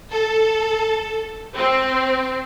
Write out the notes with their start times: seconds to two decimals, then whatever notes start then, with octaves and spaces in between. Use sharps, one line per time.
0.12 A4
1.55 C4